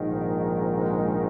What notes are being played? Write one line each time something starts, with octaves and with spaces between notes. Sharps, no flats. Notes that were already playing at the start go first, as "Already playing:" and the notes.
Already playing: A#1 G#2 D#3
G#3